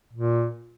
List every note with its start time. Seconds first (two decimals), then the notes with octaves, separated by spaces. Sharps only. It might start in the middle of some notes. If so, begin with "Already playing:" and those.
0.13 A#2